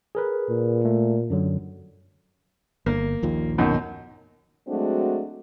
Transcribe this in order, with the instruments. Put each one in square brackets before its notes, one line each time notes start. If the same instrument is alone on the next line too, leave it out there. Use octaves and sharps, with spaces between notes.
[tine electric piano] G#4 A#4 B4
[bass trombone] A#2
[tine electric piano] A3
F#2 D3 F#3
[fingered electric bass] G1 [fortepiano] A#3
[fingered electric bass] A#1 D#2 A#2
[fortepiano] F#2 B2 D#3
[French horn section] F#3 G#3 A3 C4 D4 F#4